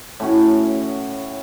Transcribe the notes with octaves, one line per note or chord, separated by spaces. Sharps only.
A2 C#4 F#4